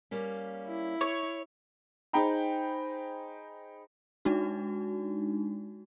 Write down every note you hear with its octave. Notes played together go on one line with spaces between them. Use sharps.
G3 A#3 C#4
E4
C#5
D#4 G#4 C5 G5 A#5 B5
G#3 D4 D#4 F#4